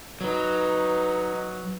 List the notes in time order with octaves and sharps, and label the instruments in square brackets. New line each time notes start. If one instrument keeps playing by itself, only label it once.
[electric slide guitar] F#3 [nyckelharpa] D#4 B4